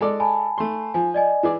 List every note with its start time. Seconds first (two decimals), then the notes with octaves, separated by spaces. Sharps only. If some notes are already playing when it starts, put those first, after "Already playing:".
0.01 G#3 A4 D5
0.20 G#5 A5 B5
0.58 A3 C6
0.94 F3 G#5
1.14 D5 D#5 G#5
1.43 E3 G#4 D5